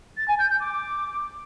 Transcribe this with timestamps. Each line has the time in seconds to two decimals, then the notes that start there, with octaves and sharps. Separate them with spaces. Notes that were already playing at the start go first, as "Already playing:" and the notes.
0.17 A6
0.28 G#5
0.39 G6
0.49 G6
0.60 D6